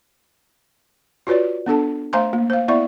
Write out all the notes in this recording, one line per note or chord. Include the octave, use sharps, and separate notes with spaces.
F4 F#4 B4 C#5 D5
B3 D4 A4 A5
A3 C5 F5 G#5 A#5 C6
A#3
C5 F5
B3 E4 D5 E5 C#6